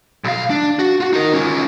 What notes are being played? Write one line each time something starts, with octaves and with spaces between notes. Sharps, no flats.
B1 F5
D4
F#4
F4 F#4
D#4 A#4
C#4 F4